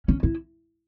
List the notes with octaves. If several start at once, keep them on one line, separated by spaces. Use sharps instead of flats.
C#4
E4